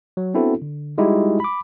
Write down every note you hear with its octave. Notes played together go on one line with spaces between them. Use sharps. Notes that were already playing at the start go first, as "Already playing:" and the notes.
F#3
B3 C4 D4 E4 F#4 A4
D3
G3 G#3 D#4 E4 F#4 G4
B5 D6